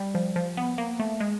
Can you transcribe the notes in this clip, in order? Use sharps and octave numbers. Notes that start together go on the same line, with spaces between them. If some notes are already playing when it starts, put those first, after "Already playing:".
Already playing: G3
F3
F3
B3
A#3
A3
G#3